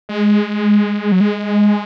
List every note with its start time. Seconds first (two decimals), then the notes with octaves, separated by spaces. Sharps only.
0.09 G#3
1.12 F#3
1.21 G#3